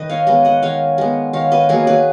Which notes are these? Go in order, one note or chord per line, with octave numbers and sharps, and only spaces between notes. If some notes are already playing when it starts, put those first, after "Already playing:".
Already playing: D#3 B4 D#5
C#5 F5
G#3 B3 B4 D#5
D#5 F#5
D#3 C#5 F5
G#3 B3
D#3 C#5 F5
B4 D#5
F#3 A#3 G#4 B4
G#4 B4